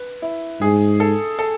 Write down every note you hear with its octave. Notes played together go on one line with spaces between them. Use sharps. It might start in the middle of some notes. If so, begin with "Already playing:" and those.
Already playing: B4
E4
G#2 G#4
A4
A4